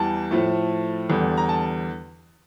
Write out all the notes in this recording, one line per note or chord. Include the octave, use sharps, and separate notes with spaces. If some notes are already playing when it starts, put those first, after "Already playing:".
Already playing: E2 E3 G3 A5
A2 F3 A3
E2 D3 G3
A#5
A5